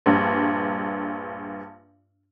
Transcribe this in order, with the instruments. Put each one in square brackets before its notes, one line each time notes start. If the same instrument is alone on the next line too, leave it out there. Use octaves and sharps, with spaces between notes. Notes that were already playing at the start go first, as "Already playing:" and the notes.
[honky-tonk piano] A#1 G2